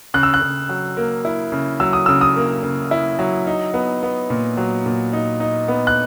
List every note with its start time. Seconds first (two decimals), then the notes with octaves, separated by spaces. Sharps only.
0.14 C#3 F#6
0.23 E6
0.34 F#6
0.41 C#3
0.69 F#3
0.97 A#3
1.25 E4
1.52 C#3
1.80 F#3 E6
1.93 D#6
2.06 C#3 E6
2.21 D#6
2.36 A#3
2.63 C#3
2.91 E4
3.19 F#3
3.47 D#4
3.74 B3
4.03 B3
4.30 A#2
4.57 F#3
4.86 A#2
5.13 D#4
5.40 D#4
5.68 B3
5.87 F#6